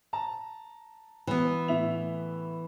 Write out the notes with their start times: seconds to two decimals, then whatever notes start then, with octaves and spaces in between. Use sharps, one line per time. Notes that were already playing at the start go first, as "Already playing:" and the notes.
0.13 A5 A#5
1.27 E3 B3
1.68 A2 E5 F7